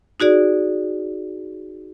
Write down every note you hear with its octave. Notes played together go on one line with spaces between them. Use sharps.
D#4 F#4 G#4 D5